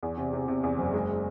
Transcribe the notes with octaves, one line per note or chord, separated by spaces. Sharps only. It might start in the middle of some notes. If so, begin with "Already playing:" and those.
E2
C3
C3
C3
E2
F#1
G#3